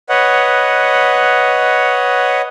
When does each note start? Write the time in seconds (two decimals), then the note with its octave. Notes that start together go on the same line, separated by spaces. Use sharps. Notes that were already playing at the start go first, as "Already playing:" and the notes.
0.09 B4 C#5 D#5 F#5